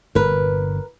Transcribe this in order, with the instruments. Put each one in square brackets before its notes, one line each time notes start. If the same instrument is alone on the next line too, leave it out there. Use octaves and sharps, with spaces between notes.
[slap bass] G1 A#2 [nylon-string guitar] A#4 B4